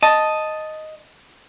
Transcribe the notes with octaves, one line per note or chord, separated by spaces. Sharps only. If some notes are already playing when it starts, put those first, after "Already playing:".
D#5 A5